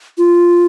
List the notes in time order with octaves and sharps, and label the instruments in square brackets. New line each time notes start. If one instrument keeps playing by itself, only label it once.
[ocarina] F4